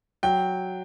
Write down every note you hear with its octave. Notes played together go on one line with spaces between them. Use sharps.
F#3 G5